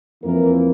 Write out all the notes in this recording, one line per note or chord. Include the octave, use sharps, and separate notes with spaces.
F2 E3 A#3 A#4